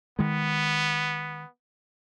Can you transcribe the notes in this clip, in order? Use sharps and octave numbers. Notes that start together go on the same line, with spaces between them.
D#3 G#3 B3